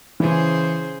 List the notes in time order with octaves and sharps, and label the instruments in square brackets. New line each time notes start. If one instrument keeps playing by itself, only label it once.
[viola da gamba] C#3 G#4 C5 [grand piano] E3